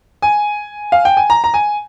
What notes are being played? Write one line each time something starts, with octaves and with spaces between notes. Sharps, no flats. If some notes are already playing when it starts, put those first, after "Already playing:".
G#5
F5
G5
G#5
A#5
A#5
G#5